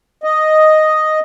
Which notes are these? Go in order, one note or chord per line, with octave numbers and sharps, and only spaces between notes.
D#5